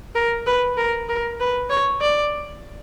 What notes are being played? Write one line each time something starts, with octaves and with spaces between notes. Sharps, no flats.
A#4
B4
A#4
A#4
B4
C#5
D5